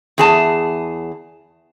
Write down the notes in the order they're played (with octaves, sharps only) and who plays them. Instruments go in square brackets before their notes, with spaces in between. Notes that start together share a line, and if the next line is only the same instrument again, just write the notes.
[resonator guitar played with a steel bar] E2 G#4 A5